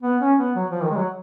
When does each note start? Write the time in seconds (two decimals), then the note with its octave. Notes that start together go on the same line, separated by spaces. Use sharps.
0.03 B3
0.20 C#4
0.38 B3
0.56 F#3
0.70 F3
0.83 D#3
0.90 G#3
0.96 F#3